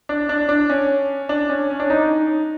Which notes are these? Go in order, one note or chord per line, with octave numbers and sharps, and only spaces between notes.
D4
D4
D4
C#4
D4
C#4
C#4
D4
D#4